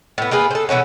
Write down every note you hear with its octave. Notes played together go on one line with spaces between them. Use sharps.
A2 B3
A#3 F4 G#4 B4
A4 C5
B2 E3 C#4 F#4